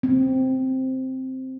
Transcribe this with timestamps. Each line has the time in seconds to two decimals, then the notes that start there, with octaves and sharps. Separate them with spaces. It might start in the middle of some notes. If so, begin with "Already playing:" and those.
0.03 C4